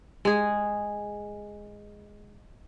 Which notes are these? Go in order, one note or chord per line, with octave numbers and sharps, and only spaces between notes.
G#3 G#4